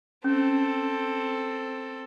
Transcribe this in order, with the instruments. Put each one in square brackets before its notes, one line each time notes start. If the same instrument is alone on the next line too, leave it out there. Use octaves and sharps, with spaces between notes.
[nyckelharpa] C4 A4 [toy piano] C#4